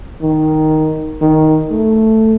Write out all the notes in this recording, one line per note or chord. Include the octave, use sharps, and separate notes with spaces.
D#3
D#3
A3